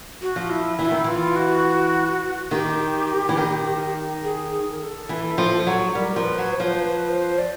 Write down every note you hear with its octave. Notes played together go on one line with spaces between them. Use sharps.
F#4
F3
E4
E3 E4
D#3
E3 F4
F#4
D#3 G4
E3
D#3
G#4
G#4
A#4
A4
E3
F3
F#3
G3 A#4
F3
B4
F#3
C5
F3 C#5
C5
B4
C5
D5